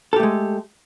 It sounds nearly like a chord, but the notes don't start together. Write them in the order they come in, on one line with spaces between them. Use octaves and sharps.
A4 G4 A3 G#3